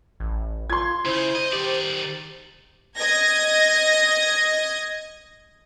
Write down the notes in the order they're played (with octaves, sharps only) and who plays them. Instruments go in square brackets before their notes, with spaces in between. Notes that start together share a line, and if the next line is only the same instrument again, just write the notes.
[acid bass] A1
[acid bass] F4 [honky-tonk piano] C6 G#6
[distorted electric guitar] C#3 [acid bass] E4 [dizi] C5
[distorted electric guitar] D#5
[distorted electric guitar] D#3 D5 [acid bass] G4
[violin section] D#5 G#6 A#6